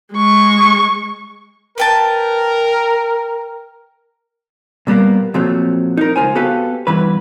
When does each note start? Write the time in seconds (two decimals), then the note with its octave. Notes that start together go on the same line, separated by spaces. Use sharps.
0.13 G#3 C#6
1.78 A#4 B4 G5 A5
4.87 A#2 G3 B3 A#4 F5
5.34 A#2 F3 F#3 A3 C4
5.97 D#4 A#4
6.16 C#2 D3 F4 C5 G#5
6.35 B3 F#4 G4 A4 B4 F5
6.87 E2 G2 E3 B4